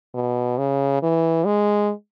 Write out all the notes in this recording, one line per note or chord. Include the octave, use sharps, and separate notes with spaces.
B2
C#3
E3
G#3